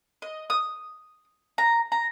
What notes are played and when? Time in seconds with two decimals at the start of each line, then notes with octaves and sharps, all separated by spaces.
0.22 D#5
0.50 D#6
1.58 A#5
1.92 A#5